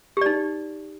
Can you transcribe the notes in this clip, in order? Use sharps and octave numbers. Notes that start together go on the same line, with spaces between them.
D#4 G4 D5